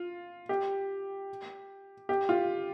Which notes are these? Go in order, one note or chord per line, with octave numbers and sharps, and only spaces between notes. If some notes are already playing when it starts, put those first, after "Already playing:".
Already playing: F4
G4
G4
F4